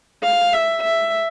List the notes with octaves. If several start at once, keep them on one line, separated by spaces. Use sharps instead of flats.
F5
E5
E5